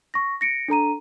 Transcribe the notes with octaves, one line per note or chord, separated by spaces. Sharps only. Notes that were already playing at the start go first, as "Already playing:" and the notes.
C#6 A#6
A#6 C#7 D7
D4 A4 A#5 D#7